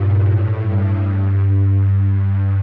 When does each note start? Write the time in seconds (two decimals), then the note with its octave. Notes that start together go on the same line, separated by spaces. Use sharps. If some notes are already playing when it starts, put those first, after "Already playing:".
Already playing: G2 A#2
0.26 A2
0.62 G2
1.69 G2
2.06 G2